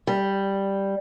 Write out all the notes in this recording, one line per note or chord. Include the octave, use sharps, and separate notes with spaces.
G3